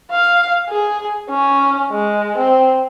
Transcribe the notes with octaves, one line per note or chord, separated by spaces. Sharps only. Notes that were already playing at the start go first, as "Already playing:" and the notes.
F5
G#4
C#4
G#3
C4